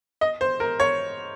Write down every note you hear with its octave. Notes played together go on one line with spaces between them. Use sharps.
D#5
C5
A#4
C#5